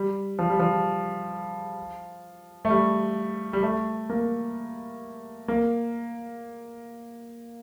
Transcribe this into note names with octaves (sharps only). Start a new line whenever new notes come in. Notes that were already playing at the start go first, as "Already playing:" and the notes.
Already playing: G3
F3
G3
F3
A3
G3
G3
A3
A#3
A#3